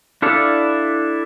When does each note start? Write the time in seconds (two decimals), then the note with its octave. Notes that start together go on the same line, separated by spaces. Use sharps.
0.22 D4 E4 A4 D5 F5